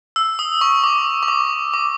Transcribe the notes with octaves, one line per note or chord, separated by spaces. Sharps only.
E6
D#6
C#6
D6
C#6
D6
D6